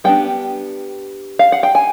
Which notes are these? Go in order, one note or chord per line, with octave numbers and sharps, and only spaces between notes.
G3 B3 D4 G5
F5
F#5
G5
G#5